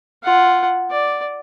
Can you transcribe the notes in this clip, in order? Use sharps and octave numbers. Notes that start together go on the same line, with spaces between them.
F4 F#5
D5